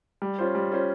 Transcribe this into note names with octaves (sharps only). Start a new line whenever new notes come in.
G3
C#4 F4 C5
G3
C#4 F4 C5